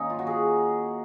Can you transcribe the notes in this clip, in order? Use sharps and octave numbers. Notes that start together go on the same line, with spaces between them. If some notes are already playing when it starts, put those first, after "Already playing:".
Already playing: D#3 A#3 C#4 D#4
F4
F#4
G#4